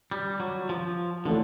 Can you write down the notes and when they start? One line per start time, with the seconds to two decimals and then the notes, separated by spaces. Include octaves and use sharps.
0.11 G3
0.40 F#3
0.69 F3
1.25 D3 E3 A3 C#4